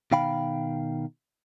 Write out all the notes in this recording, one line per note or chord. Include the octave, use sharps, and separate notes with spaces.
B2 D#3 F5 G5 B5